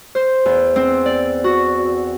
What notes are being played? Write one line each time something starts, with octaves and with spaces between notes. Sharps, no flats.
C5
E2
C4
D5
F#4